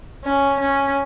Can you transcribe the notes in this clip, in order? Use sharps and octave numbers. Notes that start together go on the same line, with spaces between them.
C#4
C#4